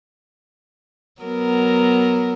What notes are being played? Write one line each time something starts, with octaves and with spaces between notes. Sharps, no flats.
F#3 B3 A#4